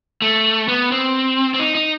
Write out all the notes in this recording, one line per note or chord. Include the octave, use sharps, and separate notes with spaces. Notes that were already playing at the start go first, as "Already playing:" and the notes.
A3
B3
C4
C4
D#4
D#4